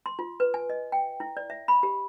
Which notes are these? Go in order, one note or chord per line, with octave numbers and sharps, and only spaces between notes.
C6
F4
B4
G#5
D#5
G5
E4
D5
E5
B5
G4